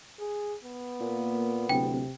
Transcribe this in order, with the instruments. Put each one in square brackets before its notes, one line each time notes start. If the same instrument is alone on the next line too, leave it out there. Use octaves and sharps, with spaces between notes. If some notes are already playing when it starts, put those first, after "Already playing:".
[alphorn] G#4
B3
[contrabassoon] A#2 [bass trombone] A#3
[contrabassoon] D1 [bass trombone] C3 [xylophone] G5